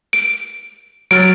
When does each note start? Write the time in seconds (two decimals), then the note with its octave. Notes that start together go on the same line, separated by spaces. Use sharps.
0.13 D7
1.11 F#3 F6 A6 D7